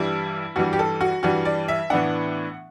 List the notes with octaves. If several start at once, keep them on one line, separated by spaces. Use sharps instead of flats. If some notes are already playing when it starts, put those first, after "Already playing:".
Already playing: G2 E3 G3 E4
G2 E3 G3 F#4
G4
A4
F#4
G2 E3 G3 F#4
D5
E5
A2 E3 B3 D4 F#5